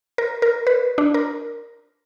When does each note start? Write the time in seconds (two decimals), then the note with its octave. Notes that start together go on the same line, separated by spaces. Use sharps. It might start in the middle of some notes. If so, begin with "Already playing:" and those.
0.18 A#4
0.42 A#4
0.67 B4
0.98 D4
1.14 A#4